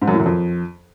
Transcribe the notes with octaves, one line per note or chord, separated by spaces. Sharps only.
G#2
F#2
A2
F#2
F2